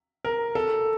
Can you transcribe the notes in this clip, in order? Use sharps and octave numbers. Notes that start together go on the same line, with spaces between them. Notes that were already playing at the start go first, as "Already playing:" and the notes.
A#4
A4